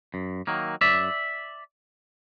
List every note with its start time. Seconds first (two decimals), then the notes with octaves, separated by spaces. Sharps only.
0.14 F#2
0.47 D#3 F#3 A#3
0.81 F#2 D5 E5